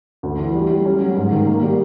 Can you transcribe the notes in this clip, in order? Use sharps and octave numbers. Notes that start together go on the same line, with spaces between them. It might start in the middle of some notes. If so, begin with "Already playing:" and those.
D2
E3
G3
G3
C#4
F#3
G#2
D#3
A#3
G3